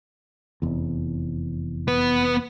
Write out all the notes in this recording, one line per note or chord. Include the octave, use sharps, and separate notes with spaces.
F1 E2
B3 B4